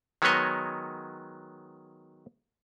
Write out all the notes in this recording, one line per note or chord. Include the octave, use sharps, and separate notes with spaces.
D#3 F#3 G#3 B3 C#5 D#5